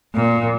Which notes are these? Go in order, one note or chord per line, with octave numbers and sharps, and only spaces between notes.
A#2